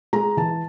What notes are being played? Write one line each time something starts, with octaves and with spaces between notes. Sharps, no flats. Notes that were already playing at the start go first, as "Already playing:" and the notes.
G#3 A#5
E3 A5